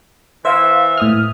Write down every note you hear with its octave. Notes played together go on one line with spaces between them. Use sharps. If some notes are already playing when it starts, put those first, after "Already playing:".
E3 C5 E5 F5
A2 D#6 F6